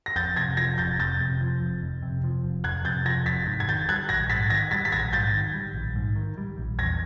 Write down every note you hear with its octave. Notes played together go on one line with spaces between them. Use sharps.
A#6
F2 G6 A6
C3 G#6 A#6
F3 G#6 A#6
F1 G6 A6
F2 G6 A6
C3
F3
F1
F2
C3
F3
F1
F2 F#6 G#6
C3 G6 A6
F3 G#6 A#6
F1 A6 B6
G#2
G#6
D#3 G6 A6
G3 F#6 G#6
A#1 G#6 A#6
G#2 A6 B6
D#3 G#6 A#6
G3 A6 B6
B6
A#1 G#6 A#6
G#2 G6 A6
D#3
G3
A#1
G#2
D#3
G3
A#1
E2 G#6 A#6